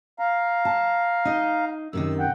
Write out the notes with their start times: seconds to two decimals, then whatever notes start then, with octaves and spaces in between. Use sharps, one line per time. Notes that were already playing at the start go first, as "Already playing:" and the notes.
0.19 F5 A#5
0.65 A5
1.25 D#4 D#5
1.93 F#2 C3 D#3 E6
2.19 F#5 G5